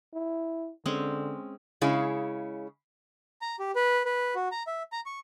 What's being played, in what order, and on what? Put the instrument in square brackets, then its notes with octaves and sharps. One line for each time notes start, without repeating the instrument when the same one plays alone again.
[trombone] E4
[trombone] D3 [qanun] G#3 C4 C#4
[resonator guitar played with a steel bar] C#3 G#3 E4 G#4 C#5 F5
[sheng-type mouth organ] A#5
G4
B4
B4
F#4
A#5
E5
A#5
C#6